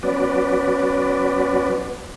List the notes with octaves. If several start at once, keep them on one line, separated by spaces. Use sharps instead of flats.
F#3 B3 C#4 B4 D5